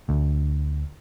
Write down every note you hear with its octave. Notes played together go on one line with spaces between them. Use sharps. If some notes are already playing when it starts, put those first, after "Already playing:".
D2